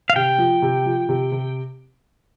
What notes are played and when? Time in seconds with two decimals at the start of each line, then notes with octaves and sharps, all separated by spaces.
0.10 F5
0.16 C3 G5
0.38 F3
0.62 C3
0.86 F3
1.09 C3
1.32 C3